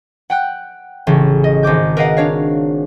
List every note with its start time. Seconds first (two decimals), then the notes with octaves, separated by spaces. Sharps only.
0.30 F#5 G5 F#6
1.07 A1 C#3
1.44 D#5
1.63 G#1 D#5 D6 G6
1.97 A#4 B4 D#5 F5 F#5
2.17 D4 C#5 F5